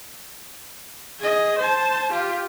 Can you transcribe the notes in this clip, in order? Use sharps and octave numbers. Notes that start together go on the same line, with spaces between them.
G#4 D#5
C5 A5
F4 G4